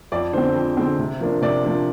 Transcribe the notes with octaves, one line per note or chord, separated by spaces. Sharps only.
F2 D5
D3 G#3 C4 C5
F2
D3 G#3 C4
C3
F3 A#3 D4
C3 D5
F3 A#3 D4